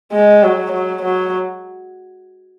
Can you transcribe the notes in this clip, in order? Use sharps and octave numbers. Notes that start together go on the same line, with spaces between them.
G#3
F#3
F#3
F#3